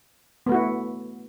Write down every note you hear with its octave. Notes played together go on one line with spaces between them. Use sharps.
A3 B3 E4 F#4